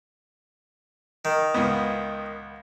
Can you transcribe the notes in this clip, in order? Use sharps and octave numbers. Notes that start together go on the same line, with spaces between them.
D#3
C#2 B3